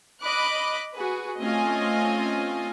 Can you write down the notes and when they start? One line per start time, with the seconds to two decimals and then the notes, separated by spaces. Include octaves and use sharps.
0.21 D#5 B5 D6 F#6
0.95 F#4 G#4 B4
1.39 A3 C4 C#4 F4 D#5 G#5